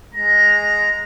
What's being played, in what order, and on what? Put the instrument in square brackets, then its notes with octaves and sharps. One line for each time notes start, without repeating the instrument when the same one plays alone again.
[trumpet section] G#3 A#5